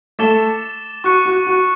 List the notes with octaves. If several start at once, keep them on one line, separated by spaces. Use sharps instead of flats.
A3 A4 D6 A6 E7 G7
F#4 C#6 F#6 C#7
F#4
F#4